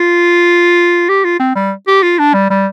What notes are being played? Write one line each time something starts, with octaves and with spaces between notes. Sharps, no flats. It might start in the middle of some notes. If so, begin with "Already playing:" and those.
Already playing: F4
G4
F4
C4
G3
G4
F4
D4
G3
G3